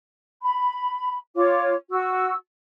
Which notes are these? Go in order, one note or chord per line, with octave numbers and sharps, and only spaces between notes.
B5
F4 C#5 D6
F#4 E6